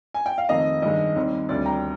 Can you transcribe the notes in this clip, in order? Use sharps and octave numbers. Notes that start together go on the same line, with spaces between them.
G#5
G5
F5
F1 F2 D#3 A#3 D#5
G2 D#3 G#3 D#5
D#2 D#3 G3 C4
D2 C3 G3 D4 D5
G5 A#5